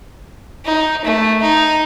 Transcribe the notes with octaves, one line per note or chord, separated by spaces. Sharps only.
D#4
A3
D#4